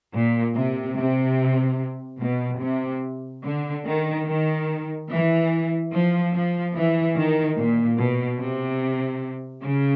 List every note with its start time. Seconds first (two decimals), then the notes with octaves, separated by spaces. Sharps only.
0.14 A#2
0.56 C3
0.97 C3
2.22 B2
2.62 C3
3.45 D3
3.86 D#3
4.27 D#3
5.10 E3
5.92 F3
6.34 F3
6.75 E3
7.16 D#3
7.57 A#2
7.99 B2
8.40 C3
9.64 C#3